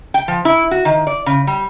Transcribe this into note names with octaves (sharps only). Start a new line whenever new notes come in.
G5
F3
E4
F#4
D#3
D5
C#3
G3